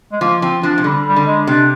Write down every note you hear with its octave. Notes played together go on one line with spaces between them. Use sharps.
G#3
F3 A#3
F3 C4
F3 D4
C3
D3 G3
G3
D3
G#3
C3 D4